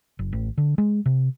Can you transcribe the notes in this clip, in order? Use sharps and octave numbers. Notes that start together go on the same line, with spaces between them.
F#1
A1
D3
G#3
C3